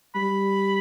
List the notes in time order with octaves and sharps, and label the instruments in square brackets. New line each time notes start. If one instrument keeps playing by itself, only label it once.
[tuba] G3 [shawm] B5